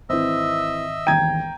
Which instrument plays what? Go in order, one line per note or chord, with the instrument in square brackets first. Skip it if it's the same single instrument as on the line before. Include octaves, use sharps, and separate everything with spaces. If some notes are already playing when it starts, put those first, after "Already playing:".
[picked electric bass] G#1 [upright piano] E3 C4 [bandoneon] D#5 E5 E6
[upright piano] E1 D#2 D#7 [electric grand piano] G5 A#5 G#6